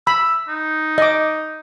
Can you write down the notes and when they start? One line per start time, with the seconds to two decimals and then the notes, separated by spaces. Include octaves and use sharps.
0.07 B5 E6
0.48 D#4
0.98 D#5 D6